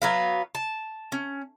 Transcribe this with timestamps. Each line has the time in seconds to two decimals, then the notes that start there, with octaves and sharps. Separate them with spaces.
0.02 F#3 B3 F5
0.55 A5
1.12 C#4